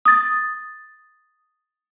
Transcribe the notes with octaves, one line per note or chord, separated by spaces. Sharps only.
D#6 A6